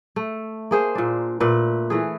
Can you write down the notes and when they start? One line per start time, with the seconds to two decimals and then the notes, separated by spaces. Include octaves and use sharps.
0.16 A3
0.71 A#3 G#4 C5
0.95 A#2 D4
1.40 A#2 A3 B4
1.90 E3 A3 G#4